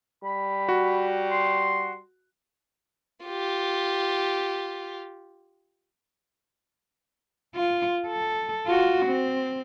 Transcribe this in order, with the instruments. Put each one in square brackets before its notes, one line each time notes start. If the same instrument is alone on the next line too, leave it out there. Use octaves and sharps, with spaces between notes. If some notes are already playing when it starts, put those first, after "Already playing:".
[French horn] G3 [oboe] B5
[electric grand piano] F#4
[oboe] C6
[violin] F4 G4
[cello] F4
A4
F4 F#4
C4